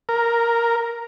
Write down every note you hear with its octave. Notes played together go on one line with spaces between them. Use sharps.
A#4